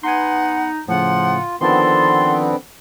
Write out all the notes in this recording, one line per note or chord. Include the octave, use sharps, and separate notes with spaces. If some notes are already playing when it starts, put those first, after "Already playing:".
B3 D#4 F#5 G#5 C6
A2 C#3 F3 F4 F#5
D3 D#3 F3 B3 C4 A4 C6